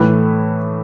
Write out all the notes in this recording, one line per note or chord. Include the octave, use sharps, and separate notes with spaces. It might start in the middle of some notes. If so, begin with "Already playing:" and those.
Already playing: A2 E3 A3 E4 B4